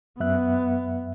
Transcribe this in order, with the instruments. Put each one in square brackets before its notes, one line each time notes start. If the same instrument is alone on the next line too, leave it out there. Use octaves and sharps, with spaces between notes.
[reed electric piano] F#2 E5 F#6 [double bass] B3